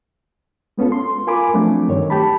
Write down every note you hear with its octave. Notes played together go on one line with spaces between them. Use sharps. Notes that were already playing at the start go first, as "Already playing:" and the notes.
G#3 B3 C#4 F4 A4
C6
F4 A#4 G#5 B5 D6
F3 F#3 A3 C4 D4
G2 D#3 C#5
G4 A5 B5